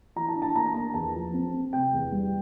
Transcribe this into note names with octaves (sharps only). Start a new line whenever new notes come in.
E3 A#5
A5
D4
A5
A#3 A#5
A#3 A#5
E2 A5
F3
C4
C4
C3 G5
E2
G3